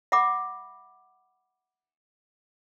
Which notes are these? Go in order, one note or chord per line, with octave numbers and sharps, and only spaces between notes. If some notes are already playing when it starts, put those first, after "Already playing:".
E5 F#5 B5 D6